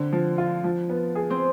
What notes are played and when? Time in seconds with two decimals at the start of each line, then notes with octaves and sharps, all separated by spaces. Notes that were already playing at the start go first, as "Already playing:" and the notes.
Already playing: D3 C4
0.13 F3
0.38 F4
0.64 F3
0.89 B3
1.15 G#4
1.30 C4